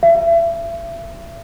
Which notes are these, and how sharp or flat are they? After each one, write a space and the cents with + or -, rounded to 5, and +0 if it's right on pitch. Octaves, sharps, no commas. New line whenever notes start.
E5 +35